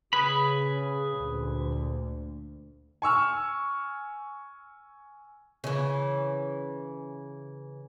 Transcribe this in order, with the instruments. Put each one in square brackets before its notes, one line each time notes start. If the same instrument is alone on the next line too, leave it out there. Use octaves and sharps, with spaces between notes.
[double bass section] C#3 [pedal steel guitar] G#4 B4 B5
[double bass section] D2 A#2
[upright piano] G#5 C#6 E6 F6
[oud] C#3 E3